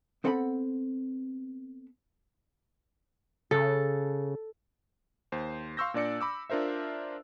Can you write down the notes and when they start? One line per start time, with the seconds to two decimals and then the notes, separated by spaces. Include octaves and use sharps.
0.24 B3 C4 A4 F#5 G5 B5
3.51 C#3 A4
5.32 D#2 C5
5.77 F5 C6 C#6 E6 G6 A#6
5.94 A#2 D4 D5 C#7
6.21 B5 D6 E6
6.50 D4 F4 A#4 C5 E5